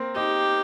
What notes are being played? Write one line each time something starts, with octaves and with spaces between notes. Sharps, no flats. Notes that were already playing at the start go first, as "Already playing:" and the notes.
Already playing: A#3 C4
D#4 G4